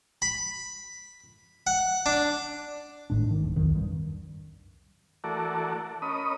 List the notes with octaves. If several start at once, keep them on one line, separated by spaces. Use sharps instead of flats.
B5
F#5
D4
G#1 A2 G#3 D4
G#2 D#3
D1
B1 F2 D#3
G2
E3 A3 F#4 A4 A#4 D5
C#4 A#4 D#5 B5 D#6